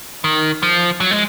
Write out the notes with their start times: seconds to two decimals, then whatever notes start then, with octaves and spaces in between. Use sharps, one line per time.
0.24 D#3
0.63 F3
1.00 F#3
1.11 G#3